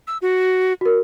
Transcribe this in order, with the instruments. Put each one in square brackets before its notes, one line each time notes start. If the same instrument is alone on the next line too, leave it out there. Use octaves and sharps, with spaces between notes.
[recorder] E6
F#4
[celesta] F#4 A#4